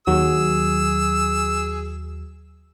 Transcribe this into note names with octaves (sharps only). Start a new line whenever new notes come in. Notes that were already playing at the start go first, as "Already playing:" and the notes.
D#2 F#3 G#4 E6